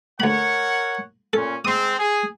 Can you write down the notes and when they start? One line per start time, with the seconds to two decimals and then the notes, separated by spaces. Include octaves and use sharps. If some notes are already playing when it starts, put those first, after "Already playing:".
0.20 D2 A#4 C#5 F#5 B5
1.33 A#2 C#4 A4
1.65 G#3 C4 C6 D#6
1.98 G#4